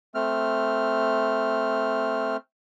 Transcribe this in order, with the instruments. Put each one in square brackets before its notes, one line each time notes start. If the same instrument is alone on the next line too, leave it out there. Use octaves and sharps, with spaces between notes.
[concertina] A3 C4 F6